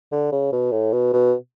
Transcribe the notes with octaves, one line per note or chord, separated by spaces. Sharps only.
D3
C#3
B2
A2
B2
B2